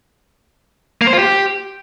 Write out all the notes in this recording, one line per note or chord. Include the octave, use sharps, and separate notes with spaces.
A#3
C5
F4
G4